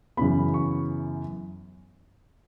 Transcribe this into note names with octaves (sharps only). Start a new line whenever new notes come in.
F#2 C#3 E3 B3 B5
C#6